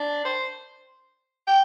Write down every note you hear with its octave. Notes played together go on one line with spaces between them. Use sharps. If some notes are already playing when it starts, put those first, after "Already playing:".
Already playing: D4
C5
G5